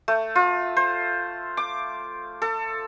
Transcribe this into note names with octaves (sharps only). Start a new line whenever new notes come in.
A3
F4
C5
D6
A4